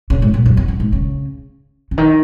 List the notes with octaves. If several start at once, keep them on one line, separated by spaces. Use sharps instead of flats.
C#3
G#2
A#2
F#2
E2
F#2
G#2
C#3
C#3
D#3